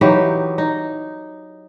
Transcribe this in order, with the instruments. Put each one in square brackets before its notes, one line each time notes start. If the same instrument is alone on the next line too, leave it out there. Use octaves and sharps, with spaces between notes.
[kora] E3 F#3 D#4 G4
D#4